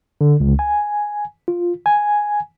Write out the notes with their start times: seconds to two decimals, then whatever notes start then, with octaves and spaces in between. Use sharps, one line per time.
0.21 D3
0.40 C#2
0.59 G#5
1.48 F4
1.86 G#5